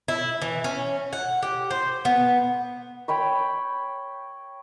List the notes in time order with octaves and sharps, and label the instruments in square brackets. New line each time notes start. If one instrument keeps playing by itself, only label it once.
[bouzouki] E4
E3
C#4
F#5
G4
C5
B3
[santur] C#5 G5 B5 C#6